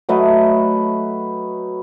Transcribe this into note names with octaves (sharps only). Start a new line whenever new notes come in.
F#3 A3 B4 D#5